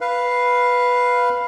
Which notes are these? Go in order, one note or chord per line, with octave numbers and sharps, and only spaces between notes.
B4 F5